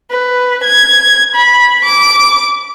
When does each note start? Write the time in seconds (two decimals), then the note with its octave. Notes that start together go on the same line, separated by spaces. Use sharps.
0.11 B4
0.64 G#6
1.35 B5
1.85 D6